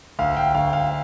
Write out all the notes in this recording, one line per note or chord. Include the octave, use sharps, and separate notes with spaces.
D2 F5
G5
D2 F5
F5